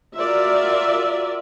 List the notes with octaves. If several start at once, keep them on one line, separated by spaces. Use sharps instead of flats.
F4 F#4 A#4 D5 E5